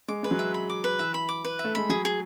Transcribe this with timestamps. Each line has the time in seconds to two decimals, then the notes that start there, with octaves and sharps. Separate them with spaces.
0.08 G#3 D6
0.23 G#3 B4
0.31 F#3
0.39 E5
0.54 B5
0.70 D6
0.84 B4
0.99 E3 E5
1.14 B5
1.29 D6
1.45 B4
1.59 E5
1.64 A3
1.75 G#3 B5
1.89 F#3 G#4
2.05 G#4